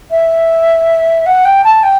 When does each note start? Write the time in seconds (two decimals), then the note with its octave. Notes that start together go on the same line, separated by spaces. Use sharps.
0.11 E5
1.26 F#5
1.45 G5
1.64 A5
1.83 G5